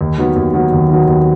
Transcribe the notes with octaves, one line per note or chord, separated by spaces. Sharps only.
D#2
D#3 F#3 B3
D#2
D#3 F#3 B3
D#2
D#3 F#3 B3
D#2